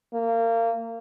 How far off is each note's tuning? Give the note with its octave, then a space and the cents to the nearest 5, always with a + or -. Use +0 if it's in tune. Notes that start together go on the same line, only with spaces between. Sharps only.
A#3 -25